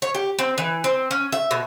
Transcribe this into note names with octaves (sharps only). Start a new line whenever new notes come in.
C#5
G4
C4
E3
C4
C#4
E5
B2